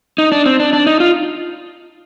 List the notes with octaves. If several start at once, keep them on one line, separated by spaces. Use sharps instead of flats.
D#4
D4
C4
D4
D4
D#4
F4